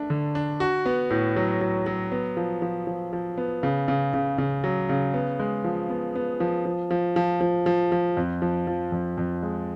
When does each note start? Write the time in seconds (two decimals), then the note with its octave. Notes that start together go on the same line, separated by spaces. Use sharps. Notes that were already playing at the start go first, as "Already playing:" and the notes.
Already playing: A3 D4
0.10 D3
0.35 D4
0.60 F#4
0.86 B3
1.10 A2
1.36 F#3
1.61 F#3
1.86 F#3
2.12 B3
2.37 F3
2.62 F3
2.87 F3
3.13 F3
3.38 B3
3.63 C#3
3.88 C#3
4.14 C#3
4.38 C#3
4.64 F#3
4.89 C#3
5.14 B3
5.39 G#3
5.64 F3
5.89 B3
6.15 B3
6.40 F3
6.65 F3
6.91 F3
7.16 F3
7.41 F3
7.66 F3
7.92 F3
8.17 F2
8.42 F3
8.67 F3
8.92 F2
9.18 F2
9.43 G#3